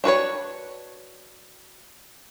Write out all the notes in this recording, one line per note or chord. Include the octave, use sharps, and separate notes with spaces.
D4 F#4 B4 C#5